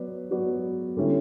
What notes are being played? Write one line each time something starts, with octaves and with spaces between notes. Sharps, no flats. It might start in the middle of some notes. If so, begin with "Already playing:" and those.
Already playing: F#3 B3 B4 D5
F#3 B3 F#4 B4 D5
D3 G3 C#4 E4